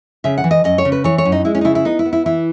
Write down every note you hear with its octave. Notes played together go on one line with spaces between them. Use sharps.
C#3 E5
F#5
E3
D#5
F#2 D#5
C#5
C#3
B4
E3 C#5
C#5
F#2
D#4
G#3 E4
C#4
D#4
C#3 E4
E4
B3 D#4
E4
B3
E4
E3 E4